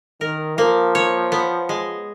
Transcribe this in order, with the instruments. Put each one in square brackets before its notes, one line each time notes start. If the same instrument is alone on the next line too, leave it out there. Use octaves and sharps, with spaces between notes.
[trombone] D#3 [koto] A#4
[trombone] F3 [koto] A#3
[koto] C#5
B3
G#3